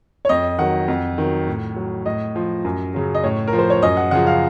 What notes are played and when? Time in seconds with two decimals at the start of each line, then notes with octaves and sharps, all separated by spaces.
0.25 C#5
0.29 F2 D#5
0.58 D#3 F#3 F#5
0.88 F2
1.18 D#3 F#3
1.47 A2
1.76 F#3
2.06 A2 D#5
2.36 F3
2.64 F#2
2.94 C#3 F#3
3.15 D#5
3.23 A2 C#5
3.47 A#4
3.53 F3
3.59 C5
3.70 C#5
3.82 F#2 D#5
3.97 F#5
4.11 C#3 F3 F#5
4.27 F5